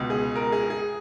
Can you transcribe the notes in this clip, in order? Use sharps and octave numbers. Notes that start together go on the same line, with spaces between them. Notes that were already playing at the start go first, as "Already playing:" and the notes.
Already playing: C#2 B2
G#4
A#4
G#4
G#4